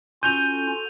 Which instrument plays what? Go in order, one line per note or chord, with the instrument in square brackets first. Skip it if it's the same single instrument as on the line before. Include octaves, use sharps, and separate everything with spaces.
[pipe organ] C#4 F4 [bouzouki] F#4 A4 [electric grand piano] G6 [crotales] D#7 F7 G7